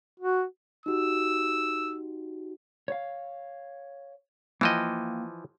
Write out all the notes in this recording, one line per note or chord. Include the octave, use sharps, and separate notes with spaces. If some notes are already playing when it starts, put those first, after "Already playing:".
F#4
D#4 F#4 G4 E6
C#5 F5
E3 F3 A#3 D#5 G5